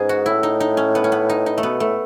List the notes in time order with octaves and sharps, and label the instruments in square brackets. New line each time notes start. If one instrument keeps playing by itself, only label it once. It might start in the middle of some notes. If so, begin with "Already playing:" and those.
Already playing: [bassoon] G#2 [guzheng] B3 C#4 G#4
[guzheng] F#4
[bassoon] A2 [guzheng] E4
[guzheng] D#4
D#4
C#4
B3
C#4
B3
D#4
D#4
A3
[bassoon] B2 [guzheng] B3
[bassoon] A2 [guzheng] A3